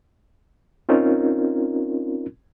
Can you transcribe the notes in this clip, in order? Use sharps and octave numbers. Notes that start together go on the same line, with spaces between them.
C4 C#4 D#4 F4 A#4